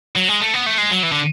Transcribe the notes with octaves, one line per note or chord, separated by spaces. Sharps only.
F#3
G#3
A3
B3
A3
G#3
F#3
E3
D3